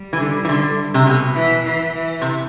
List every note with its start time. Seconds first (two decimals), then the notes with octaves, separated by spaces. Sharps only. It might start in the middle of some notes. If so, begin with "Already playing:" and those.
Already playing: G3
0.13 E3
0.20 D3
0.45 E3
0.49 D3
0.94 C3
1.06 B2
1.34 E3
1.64 E3
1.93 E3
2.21 C3